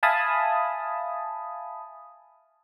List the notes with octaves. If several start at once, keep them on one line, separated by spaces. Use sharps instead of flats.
E5 F5 G#5 A5 B5 D#6